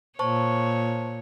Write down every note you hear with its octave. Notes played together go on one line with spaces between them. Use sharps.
A#2 C5 C#5 A5 C#6